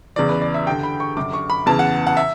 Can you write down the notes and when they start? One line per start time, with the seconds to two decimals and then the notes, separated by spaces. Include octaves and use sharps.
0.16 E2 C#3 E3 D5
0.29 B4
0.42 D5
0.54 E5
0.67 G2 D3 G5
0.83 B5
1.00 C#6
1.17 F#2 D3 D6
1.33 C#6
1.50 B5
1.66 E2 C#3 E3 A5
1.79 F#5
2.07 F#5
2.17 E5